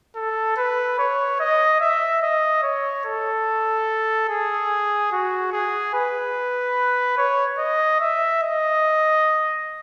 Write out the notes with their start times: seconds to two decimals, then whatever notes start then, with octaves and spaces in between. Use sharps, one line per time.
0.16 A4
0.57 B4
0.99 C#5
1.40 D#5
1.81 E5
2.22 D#5
2.63 C#5
3.05 A4
4.29 G#4
5.12 F#4
5.52 G#4
5.94 B4
7.18 C#5
7.59 D#5
8.00 E5
8.43 D#5